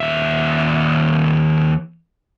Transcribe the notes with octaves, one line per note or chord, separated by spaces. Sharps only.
D#2 E5